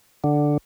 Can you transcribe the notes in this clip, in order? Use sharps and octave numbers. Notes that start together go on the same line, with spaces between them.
D3